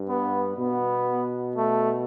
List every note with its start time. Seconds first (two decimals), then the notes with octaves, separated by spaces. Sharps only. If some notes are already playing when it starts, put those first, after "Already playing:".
Already playing: G2
0.09 B3
0.58 B2 B3
1.56 A3